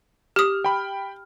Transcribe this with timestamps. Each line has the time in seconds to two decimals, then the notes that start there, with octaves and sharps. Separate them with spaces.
0.36 G4 D#6 F6
0.64 G5 B5